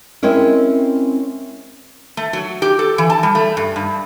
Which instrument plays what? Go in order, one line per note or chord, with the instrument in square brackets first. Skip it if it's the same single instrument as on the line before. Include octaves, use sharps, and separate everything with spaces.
[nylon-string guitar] G#3 C4 C#4 E4 A#4
[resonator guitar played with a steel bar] A3
F#3
G4
A4
E3
A5
G3
A3
G2
G2